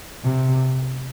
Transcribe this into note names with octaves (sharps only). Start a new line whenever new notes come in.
C3